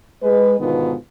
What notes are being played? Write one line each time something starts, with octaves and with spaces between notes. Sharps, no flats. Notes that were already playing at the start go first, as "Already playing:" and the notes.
G#3 B4
G#2 B2 D3 D#3 B3 F4